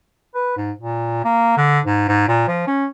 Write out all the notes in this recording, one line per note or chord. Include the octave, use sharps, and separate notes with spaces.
B4
G#2
A#2
A#3
D3
G#2
G#2
A#2
F3
C#4